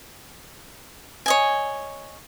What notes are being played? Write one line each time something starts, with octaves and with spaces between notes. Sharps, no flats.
C#5 D#5 G#5